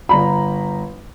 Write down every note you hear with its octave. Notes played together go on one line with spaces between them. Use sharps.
G1 A#5 B5